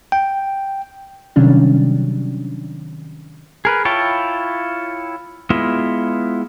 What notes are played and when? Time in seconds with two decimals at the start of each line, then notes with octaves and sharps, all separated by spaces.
0.12 G5
1.36 C3 D#3 F#3 G3 C#4 D4
3.65 G#4 A#4 B4
3.85 E4 F4 C#5 G5 A5
5.50 G#3 B3 E4 F4